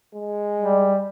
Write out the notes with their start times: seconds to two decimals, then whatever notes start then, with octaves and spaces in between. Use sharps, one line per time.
0.14 G#3
0.59 G3